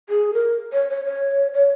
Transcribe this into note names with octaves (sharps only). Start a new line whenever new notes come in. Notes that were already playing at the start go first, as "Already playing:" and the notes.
G#4
A#4
C#5
C#5
C#5
C#5